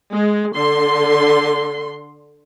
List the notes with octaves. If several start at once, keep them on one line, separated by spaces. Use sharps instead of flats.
G#3
D3 C6